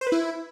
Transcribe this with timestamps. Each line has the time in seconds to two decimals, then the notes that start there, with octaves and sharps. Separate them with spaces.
0.01 C5
0.07 B4
0.12 E4